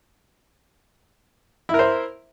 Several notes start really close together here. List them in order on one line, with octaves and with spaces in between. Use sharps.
E4 A#4 C5